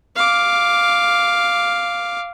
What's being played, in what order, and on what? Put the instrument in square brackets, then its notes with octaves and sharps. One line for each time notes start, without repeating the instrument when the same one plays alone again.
[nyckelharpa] F5 D6